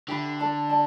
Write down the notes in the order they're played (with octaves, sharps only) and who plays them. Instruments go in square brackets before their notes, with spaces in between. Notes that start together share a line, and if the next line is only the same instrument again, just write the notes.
[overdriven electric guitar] D3 [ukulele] G4 E5 B5
[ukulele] A4 D5 A5
D5 A5